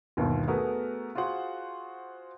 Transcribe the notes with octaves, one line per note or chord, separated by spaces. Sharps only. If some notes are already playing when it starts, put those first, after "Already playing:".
G1 D#2 B2 F4 A#4
A3 B3 F#4 G#4 A#4
F4 F#4 G#4 C5 F#5